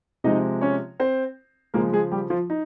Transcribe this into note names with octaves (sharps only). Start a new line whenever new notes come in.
C3 F3 G#3 D#4 D#5
C#4 C#5
C4 C5
C#3 F3 G#3 A#3 A#4
G#3 G#4
G3 G4
F3 F4
D#4